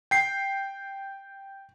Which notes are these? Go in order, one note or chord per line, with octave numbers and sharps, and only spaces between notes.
G5 C7